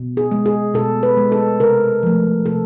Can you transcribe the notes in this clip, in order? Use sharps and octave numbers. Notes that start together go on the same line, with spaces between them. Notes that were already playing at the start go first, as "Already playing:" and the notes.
Already playing: B2
G#4
G#3
G#4
B2 A4
B4
G#3
A4
C3 A#4
F3 A3
C3 A4